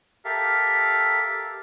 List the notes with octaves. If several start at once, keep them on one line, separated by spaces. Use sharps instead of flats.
G4 A4 A#4 E5 F5